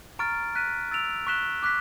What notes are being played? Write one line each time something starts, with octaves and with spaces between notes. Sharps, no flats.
A#5 C#6 F6 A6 D7
F#6 B6 D#7
E6 A6 D7 F7
C#6 F#6 B6 E7 G7
D6 F#6 B6